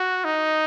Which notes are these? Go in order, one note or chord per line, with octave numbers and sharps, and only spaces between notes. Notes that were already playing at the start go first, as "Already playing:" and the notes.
Already playing: F#4
D#4